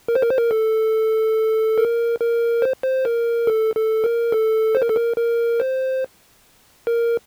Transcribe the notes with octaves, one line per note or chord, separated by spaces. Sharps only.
A#4
C5
A#4
C5
A#4
A4
A#4
A#4
C5
C5
A#4
A4
A4
A#4
A4
C5
A#4
A4
A#4
A#4
C5
A#4